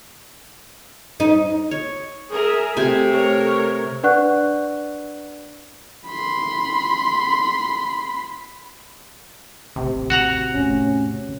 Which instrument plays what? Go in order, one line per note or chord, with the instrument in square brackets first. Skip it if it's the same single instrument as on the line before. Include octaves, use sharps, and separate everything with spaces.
[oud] D#4
[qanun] C#5
[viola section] G#4 A#4 E5
[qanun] C3 G#5 [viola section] A3
[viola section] A3 A#4 C#5
[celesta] D4 B4 D5 F#5 C#6 F#6
[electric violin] B5 C6
[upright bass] A1 D#2 [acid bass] C3
[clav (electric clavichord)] F#4 F#5 A#5
[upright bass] E2 A2 [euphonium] C#4